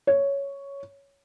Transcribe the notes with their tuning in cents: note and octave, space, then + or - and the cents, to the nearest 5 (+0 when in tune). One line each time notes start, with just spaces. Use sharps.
C#5 +5